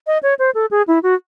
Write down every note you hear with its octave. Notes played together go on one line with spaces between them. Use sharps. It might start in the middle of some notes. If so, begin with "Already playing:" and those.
D#5
C#5
C5
A4
G#4
E4
F#4